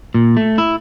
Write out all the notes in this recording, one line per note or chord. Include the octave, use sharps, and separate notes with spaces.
A#2
A3
E4